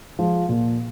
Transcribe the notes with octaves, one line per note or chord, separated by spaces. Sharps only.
F3 G#3
A#2